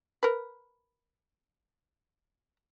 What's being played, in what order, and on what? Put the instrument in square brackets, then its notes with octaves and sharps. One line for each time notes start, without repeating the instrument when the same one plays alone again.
[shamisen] A#4 B4